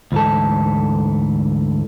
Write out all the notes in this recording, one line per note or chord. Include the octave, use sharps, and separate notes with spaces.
D2 G#2 E3 A4